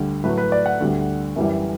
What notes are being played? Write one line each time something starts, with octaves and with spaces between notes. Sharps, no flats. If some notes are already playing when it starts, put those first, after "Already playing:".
Already playing: D2 D3 G3
A2 F#3 A3 B4
B4
D5
F#5
D2 D3 G3
F#2 E3 G3